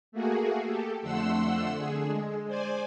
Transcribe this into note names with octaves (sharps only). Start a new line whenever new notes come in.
A3 A#3 F#4 G#4
G4 A4
F2 D3 A3 F#5 C6 E6
D3 G#4
G#3
C5 D5 G#5